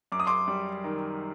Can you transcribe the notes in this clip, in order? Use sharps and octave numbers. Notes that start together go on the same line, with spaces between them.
F#2 D6
D#6
C6 D6
G3
D#3